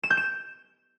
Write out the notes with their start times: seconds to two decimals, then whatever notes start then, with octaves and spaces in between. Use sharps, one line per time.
0.04 E7
0.10 G6
0.17 E7